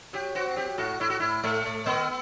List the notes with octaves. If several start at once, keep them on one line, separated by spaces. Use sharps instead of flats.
F#3 G4
C4 F#4
F#3 G4
A2 F#4
A2 E4
F#4
A2 E4
A2 A3
A2
D#3 B3